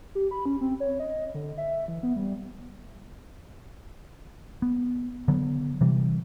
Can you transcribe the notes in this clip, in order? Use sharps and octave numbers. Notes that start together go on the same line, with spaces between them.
G4
B5
C#4
C4
C#5
D#5
D3
E5
E3
B3
G3
B3
D3 F#3 B3
C3 E3 G3